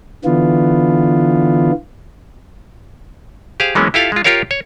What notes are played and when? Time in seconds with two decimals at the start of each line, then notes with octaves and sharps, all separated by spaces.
0.25 D3 E3 B3 F4
3.60 G4 G#4 C5 F5
3.75 E3 F#3 G#3 A#3 B3 C#4
3.94 E4 F4 G4 A4 F5
4.12 G#3 F4
4.24 F4 G4 A#4 C#5 F5
4.51 C#5